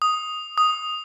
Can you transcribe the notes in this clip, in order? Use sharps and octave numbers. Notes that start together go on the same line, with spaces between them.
D#6
D#6